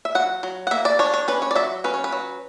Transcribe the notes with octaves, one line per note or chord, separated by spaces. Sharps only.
E5
F#3 F#5
F#3
F#5
A#3 E5
D5
D4 C#5
C#5
C#4 B4
C#5
D5
F#3 E5
C#4 B4
C#5
B4
F#3